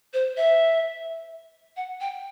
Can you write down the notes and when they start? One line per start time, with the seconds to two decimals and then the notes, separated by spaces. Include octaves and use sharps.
0.14 C5
0.37 E5
1.77 F#5
2.01 G5